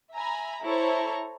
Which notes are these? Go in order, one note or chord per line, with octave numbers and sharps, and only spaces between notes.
E5 G#5 A#5 B5
E4 A4 C5 C#5 A#5 C#6